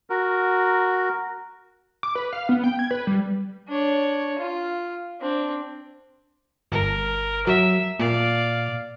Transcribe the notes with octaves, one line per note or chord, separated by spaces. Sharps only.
F#4 A#4
D6
B4
F5
B3
G5
G#6
B4
G3
D4 C#5
F4
C4 D4
G1 A#4
F#3 E5
A#2 D5 F5